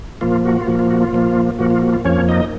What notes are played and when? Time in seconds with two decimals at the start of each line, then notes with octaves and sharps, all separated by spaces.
0.21 A#2 F3 A#3 F4
0.45 F#4
0.57 F4
0.67 A#2 F3 A#3 F#4
0.79 F4
0.91 F#4
1.02 F4
1.13 A#2 F3 A#3
1.59 A#2 F3 A#3 F#4
1.70 F4
1.82 F#4
1.93 F4
2.05 F2 F3 A#3 C#4 C#5
2.28 D#4 D#5